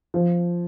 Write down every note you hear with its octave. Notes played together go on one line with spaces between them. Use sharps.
F3